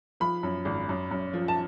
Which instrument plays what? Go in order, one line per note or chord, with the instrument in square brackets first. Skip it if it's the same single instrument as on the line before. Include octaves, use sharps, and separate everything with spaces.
[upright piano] F3 B5
F#2
G#1
F#2
F#2
F3
A5